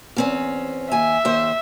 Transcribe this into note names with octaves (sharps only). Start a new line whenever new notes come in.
E2 C4 C#4
D#2 E5 G#5
D#2 C5